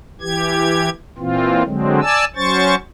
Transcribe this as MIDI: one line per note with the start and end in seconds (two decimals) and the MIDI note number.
0.21 0.89 52
0.21 0.89 67
0.21 0.89 92
1.18 1.63 46
1.18 1.63 52
1.18 1.63 60
1.18 1.63 65
1.65 2.00 50
1.65 2.00 54
1.65 2.00 56
1.65 2.00 60
2.01 2.25 74
2.01 2.25 80
2.01 2.25 81
2.01 2.25 88
2.36 2.75 54
2.36 2.75 61
2.36 2.75 72
2.36 2.75 85
2.36 2.75 93